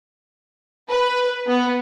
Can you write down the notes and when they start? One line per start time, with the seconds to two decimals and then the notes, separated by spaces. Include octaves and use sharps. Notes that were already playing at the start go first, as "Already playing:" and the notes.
0.89 B4
1.47 B3